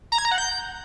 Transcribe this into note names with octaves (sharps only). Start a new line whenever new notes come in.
A#5
G#6
A#5
F#5
G6